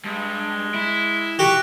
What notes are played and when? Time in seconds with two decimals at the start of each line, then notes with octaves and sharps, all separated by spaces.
0.05 G2 G#3
0.74 E4
1.39 F#4 G4